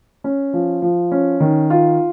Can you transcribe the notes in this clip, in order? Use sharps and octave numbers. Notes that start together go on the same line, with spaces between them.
C#4
F3
F3
C#4
D#3
F4